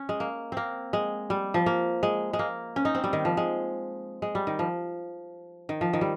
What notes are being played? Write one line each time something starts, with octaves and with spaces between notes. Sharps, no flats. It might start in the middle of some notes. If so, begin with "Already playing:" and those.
Already playing: C#4
G#3
A#3
A#3 C4
G#3
G3
F3
A#3
G#3
G#3
A#3
C#4
D#4
C4
G3
D#3
F3
G#3
G#3
G3
D#3
F3
D#3
F3
D#3
G3